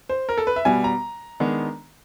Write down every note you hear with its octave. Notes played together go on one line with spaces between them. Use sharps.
C5
A#4
A4
B4
E5
B2 G3 B3 G#5
A#5
D#3 G#3 B3 D4